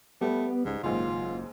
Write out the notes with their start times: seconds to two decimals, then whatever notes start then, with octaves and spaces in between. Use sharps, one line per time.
0.21 G3 A3 B3
0.65 C#2 G#2
0.83 F#1 D#2 G#2 F4